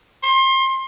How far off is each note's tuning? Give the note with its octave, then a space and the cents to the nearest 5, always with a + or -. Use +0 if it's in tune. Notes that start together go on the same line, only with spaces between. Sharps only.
C6 +30